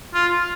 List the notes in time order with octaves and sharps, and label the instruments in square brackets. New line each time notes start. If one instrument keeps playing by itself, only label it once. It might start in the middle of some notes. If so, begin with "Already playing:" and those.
[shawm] F4